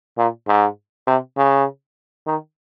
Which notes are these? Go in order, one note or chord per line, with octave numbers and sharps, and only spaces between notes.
A#2
G#2
C3
C#3
D#3